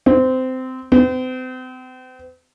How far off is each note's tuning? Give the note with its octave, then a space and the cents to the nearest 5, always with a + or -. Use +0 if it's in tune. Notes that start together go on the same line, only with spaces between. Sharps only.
C4 -20
C4 -40